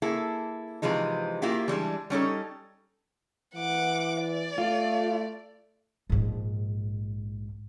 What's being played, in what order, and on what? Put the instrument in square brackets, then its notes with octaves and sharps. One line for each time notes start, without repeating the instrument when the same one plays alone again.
[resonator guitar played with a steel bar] A#3 E4 G#4 A4
C3 E3 F3 G#3 D#4
A#3 E4 F4 G4 G#4
E3 G3 G#3 D4
G3 C#4 D#4 A4
[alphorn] E3 [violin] F#5 D6
[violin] D5
[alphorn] A3 [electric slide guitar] F4
[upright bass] A#1 G#2